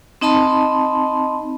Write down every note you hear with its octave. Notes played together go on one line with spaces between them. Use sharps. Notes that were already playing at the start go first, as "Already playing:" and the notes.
C4 D#4 D#5 A5 B5 C6